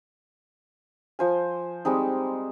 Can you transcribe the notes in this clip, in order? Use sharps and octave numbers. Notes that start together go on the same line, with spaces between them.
F3 C5 G#5
G3 G#3 C4 D#4